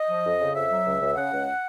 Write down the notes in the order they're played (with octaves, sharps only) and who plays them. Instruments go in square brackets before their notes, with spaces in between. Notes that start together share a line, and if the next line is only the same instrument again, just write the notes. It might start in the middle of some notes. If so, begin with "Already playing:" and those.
Already playing: [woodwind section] D#5
F3
F2
C#3
F2 E5
F#3
C#2
C#2
C#3 F#5
C#2